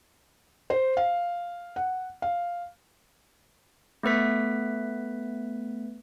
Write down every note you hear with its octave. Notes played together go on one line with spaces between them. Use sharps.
C5
F5
F#5
F5
A3 B3 B4 B6